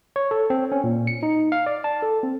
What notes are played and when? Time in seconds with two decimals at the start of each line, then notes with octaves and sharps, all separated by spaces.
0.16 C#5
0.31 A4
0.50 C4
0.72 C#4
0.84 A#2
1.07 C#7
1.23 D#4
1.52 F5
1.66 D5
1.84 A5
2.02 A4
2.23 C4